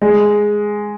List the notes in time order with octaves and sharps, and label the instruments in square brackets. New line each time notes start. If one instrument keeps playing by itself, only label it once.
[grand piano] G#3